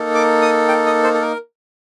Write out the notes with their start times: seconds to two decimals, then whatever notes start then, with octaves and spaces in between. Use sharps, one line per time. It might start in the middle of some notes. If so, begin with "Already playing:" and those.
Already playing: A#3 D#4 A4
0.15 D6
0.42 D#6
0.68 G5
0.86 D#5
1.03 C5
1.14 A4
1.21 A#4